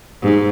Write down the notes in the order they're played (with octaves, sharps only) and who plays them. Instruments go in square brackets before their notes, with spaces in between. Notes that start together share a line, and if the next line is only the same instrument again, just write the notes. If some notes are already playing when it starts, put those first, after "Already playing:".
[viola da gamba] G#2